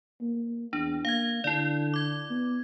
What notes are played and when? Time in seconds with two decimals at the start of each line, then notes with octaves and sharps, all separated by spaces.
0.21 A#3
0.73 E2 D4
1.05 A#3 F5 G#6
1.44 D3 E4 D5
1.94 D6 G#6
2.30 B3